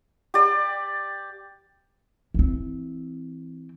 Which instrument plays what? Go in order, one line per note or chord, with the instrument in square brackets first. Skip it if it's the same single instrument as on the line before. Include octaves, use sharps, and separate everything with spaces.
[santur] G4 D5
[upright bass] E3 C4